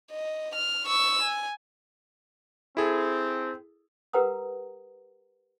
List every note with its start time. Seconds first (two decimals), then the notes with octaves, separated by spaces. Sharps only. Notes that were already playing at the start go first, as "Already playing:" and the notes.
0.11 D#5
0.55 F6
0.86 C#6 E6
1.23 G#5
2.77 C4 E4 G#4 A4
4.13 G4 A#4 B4 F#5 A#5 D#6